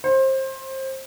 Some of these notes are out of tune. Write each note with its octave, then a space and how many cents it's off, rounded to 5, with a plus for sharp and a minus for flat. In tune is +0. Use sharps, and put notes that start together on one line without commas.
C5 +25